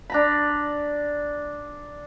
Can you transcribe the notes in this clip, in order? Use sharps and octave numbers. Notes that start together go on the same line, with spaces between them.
D4 A#5 B5